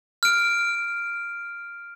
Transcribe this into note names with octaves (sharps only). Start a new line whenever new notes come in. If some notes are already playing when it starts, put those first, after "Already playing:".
F6 D7